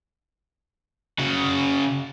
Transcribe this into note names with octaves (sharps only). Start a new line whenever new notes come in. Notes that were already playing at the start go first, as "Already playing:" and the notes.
C#3 F#4